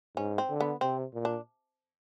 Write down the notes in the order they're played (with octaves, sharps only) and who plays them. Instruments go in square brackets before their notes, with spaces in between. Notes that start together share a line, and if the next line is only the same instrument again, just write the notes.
[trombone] G#2 [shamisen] C#4
[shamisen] C4
[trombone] D3
[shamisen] B3
[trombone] C3 [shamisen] C4
[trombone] A#2
[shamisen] D4